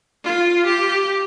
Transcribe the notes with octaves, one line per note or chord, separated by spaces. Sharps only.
F4
G4